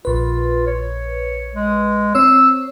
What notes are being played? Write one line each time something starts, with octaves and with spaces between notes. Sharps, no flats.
A#1 F4 B4
C#5
G#3
C4 C#5 E6